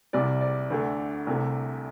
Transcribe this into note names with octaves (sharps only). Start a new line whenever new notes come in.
C2 C3 G3 D5
D5
D2 D3 A3
C2 C3 A3